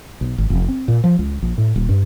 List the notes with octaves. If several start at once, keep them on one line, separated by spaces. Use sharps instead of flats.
B1
G#1
F1
C4
A#2
F3
C#2
A#1
A2
D#1
G2